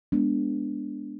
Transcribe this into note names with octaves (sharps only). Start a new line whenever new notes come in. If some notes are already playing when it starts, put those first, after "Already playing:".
G#3 B3 D4